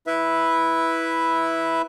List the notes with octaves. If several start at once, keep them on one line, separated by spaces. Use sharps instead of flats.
E4 B4 E5